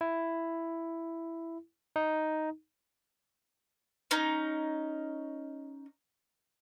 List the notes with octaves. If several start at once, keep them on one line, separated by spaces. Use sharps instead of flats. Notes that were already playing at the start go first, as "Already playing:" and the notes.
E4
D#4
C#4 D#4